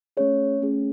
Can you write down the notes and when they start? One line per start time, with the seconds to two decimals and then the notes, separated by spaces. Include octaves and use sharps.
0.17 A3 C#4 G#4 C#5
0.62 A3 C#4 G#4